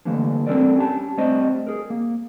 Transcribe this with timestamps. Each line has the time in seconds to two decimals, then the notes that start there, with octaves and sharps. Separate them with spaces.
0.05 D3 E3 G3 A3 A#3
0.47 G3 C4 D4 A4 A#4 D5
0.76 C#4 G4 A5
1.17 G3 A3 C4 D4 C5 D#5
1.67 G#4 A#4
1.90 A#3